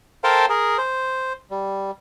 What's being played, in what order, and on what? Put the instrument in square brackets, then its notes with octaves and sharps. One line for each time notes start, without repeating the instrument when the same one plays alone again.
[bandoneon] A4 A#4 C5 F5 G5 A5
G#4 A#4
C5
G3